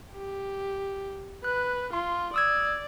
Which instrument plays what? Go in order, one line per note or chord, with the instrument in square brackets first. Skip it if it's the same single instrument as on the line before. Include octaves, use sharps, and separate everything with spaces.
[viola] G4
[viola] B4 [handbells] F#6
[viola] F4 [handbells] C6
[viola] D5 [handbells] D#6 E6 G#6